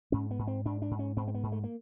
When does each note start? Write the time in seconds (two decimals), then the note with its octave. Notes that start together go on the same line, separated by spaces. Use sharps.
0.12 G#2 C#4
0.31 B3
0.39 G#2
0.47 C4
0.65 G#2 D4
0.82 D4
0.91 G#2
0.99 C#4
1.17 G#2 C4
1.28 C4
1.34 B3
1.43 G#2
1.52 A3
1.64 A#3